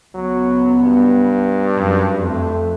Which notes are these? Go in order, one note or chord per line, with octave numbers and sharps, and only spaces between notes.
C#2 F#3 B3
G2
F#2
F2 A3